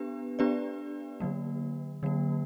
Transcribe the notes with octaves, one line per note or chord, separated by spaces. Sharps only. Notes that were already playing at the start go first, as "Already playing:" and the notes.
Already playing: B3 D4 G4 B4
B3 D4 G4 B4 D5
D3 F#3 A#3
D3 F#3 A#3